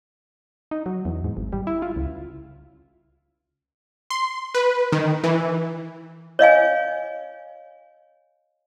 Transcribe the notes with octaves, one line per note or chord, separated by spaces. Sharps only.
D#4
F#3
E2
G#2
G#1
G3
E4
F4
C#2
C6
B4
D#3
E3
C#5 D#5 F5 G#5